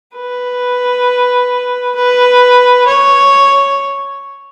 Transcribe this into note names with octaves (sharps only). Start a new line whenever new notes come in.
B4
B4
C#5